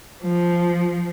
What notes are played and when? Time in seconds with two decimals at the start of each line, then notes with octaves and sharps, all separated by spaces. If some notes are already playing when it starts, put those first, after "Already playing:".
0.23 F3